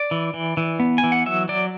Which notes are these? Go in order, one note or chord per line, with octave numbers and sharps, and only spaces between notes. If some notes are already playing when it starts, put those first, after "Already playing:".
Already playing: D5
E3
E3
E3
B3
G#5
E3
F#5
F#3 E5
F#3 D5